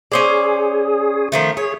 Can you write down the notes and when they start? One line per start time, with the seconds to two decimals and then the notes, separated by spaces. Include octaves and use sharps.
0.12 C#4 G#4 C5 D5
1.32 D#3 F3 A3
1.57 G#4 C#5